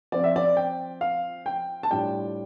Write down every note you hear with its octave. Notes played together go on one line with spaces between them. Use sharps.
F3 C4 F4 D5
E5
D5
G5
F5
G5
A5
A2 G3 D4 F4 G5